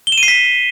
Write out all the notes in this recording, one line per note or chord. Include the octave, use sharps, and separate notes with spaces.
G7
E7
D#7
C7
B6